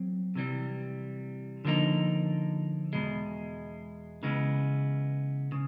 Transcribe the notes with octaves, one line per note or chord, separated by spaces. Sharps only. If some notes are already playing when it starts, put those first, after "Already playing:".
Already playing: F#3 C4
C3 E3 G3
D3 F3 A#3 D#4
E2 B2 G#3
C#3 E3 G#3 B3
C#3